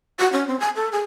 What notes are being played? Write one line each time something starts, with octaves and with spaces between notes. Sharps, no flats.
F#4
C#4
C4
G#5
A4
G#4